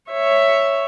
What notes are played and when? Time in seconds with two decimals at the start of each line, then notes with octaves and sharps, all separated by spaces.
0.11 C#5 E5